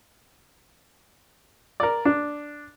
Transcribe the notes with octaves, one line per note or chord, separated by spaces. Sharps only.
A#4 D5
D4